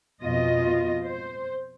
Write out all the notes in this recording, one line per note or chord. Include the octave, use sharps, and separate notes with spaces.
F2 B2 F4 D#5
C5